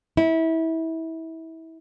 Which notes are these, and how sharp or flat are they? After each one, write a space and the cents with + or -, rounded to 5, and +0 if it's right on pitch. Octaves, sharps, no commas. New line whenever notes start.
E4 -25